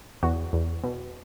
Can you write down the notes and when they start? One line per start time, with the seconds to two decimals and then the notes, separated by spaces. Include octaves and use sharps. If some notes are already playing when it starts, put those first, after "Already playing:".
0.23 E2 F#4
0.53 E2
0.84 B2